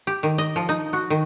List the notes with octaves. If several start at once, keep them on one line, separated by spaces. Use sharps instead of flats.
G4
D#3
D#5
F3
D#4
F#4
D#3